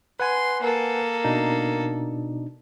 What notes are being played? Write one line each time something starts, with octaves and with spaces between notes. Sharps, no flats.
B4 F#5 G#5 C6
A#3 A4
B2 D4 D#4